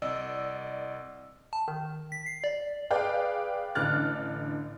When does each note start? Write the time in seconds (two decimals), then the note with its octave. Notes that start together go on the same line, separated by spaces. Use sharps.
0.02 C2 D5 D#5 E6
1.53 A5
1.68 D#3
2.12 B6
2.26 C7
2.44 D5
2.91 G#4 B4 D5 F5 G5
3.75 A1 D3 D4 F6 F#6 A6